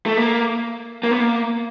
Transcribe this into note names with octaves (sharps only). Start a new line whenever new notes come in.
A3
A#3
A#3
B3
A#3